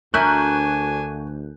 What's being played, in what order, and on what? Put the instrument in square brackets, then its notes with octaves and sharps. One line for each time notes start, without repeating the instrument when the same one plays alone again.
[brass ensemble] D2 [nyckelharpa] D4 G#5 [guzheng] A#4 E5 [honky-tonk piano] C#6 F#6 G6